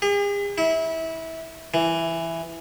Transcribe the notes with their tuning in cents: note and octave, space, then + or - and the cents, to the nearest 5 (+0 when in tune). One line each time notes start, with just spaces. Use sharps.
G#4 -45
E4 -25
E3 +10